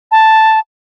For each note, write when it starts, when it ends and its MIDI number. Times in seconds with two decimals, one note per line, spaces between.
0.12 0.59 81